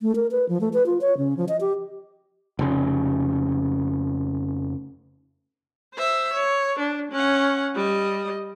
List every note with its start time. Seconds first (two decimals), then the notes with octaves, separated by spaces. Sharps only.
0.02 A3
0.16 A#4
0.31 B4
0.49 F3
0.61 A3
0.73 B4
0.86 F4
1.01 C#5
1.18 C#3
1.37 F3
1.49 D#5
1.61 G4
2.59 F1 C#3
5.94 C5 E5
6.33 C#5
6.79 D4
7.12 C#4 F#5
7.75 G3 D#5